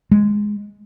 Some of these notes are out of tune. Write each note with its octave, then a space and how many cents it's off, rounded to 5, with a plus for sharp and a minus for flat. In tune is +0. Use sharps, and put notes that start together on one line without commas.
G#3 +0